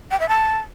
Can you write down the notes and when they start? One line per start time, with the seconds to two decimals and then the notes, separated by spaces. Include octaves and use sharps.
0.11 G5
0.19 E5
0.28 A5